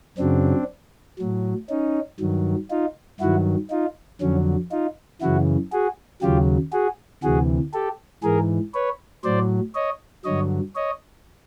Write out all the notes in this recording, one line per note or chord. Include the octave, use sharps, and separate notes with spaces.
F#2 C#3 F#3 C4 D4
A2 F#3
C#4 D#4
G2 D#3 F#3
D#4 F4
G2 D#3 F#3 E4 F#4
D#4 F4
F2 D3 F#3 C#4
D#4 F4
F#2 C#3 E3 E4 F#4
F#4 G#4
D#2 C#3 F#3 F4 G4
F#4 G#4
D2 C3 E3 F#4 G#4
G4 A4
G#2 E3 G#4 A#4
B4 C#5
A2 F#3 C5 D5
C#5 D#5
G2 D3 F#3 C#5 D#5
C#5 D#5